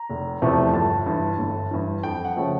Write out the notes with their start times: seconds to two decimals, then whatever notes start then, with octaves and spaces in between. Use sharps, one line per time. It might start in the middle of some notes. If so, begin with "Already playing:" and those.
Already playing: A#5
0.10 F1
0.42 E2 C3 F3 A3
0.74 G1 A5
1.06 G2 E3
1.39 G1
1.71 G2 E3
2.03 F2 G5
2.25 F#5
2.36 C#3 F3 A3